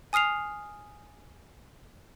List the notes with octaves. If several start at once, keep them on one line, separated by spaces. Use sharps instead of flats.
G#5 D#6 F6 C7 F7